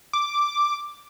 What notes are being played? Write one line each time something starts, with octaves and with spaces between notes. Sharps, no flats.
D6